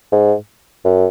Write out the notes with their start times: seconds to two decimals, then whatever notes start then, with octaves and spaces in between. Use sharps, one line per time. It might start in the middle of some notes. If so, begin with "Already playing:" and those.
0.12 G#2
0.85 F#2